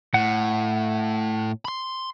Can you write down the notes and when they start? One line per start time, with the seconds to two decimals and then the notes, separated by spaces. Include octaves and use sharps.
0.14 A2 F#5
1.65 B5 C6